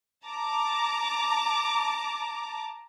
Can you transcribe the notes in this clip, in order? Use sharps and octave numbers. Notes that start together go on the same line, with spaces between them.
A5 A#5 D6